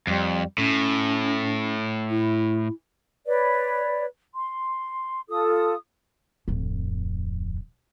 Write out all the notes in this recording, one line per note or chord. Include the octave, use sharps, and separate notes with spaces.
F2 G3
A2 C#4
E4
B4 C#5 D5
C6
F4 A4 D#6
D1 F2